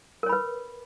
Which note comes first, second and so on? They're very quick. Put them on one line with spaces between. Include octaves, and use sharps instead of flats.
A#4 C#5 B5 B4